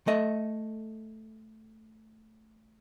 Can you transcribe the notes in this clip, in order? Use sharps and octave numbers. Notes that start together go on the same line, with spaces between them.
A3 A4 D#5 E5